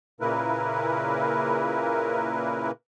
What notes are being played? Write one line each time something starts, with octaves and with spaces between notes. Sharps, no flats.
A#2 C#3 A#3 E4 A#4 B4